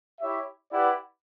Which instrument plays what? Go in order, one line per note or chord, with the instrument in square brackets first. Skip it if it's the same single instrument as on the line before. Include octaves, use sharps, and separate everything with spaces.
[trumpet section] E4 G4 C#5 E5
E4 G4 B4 D5 F#5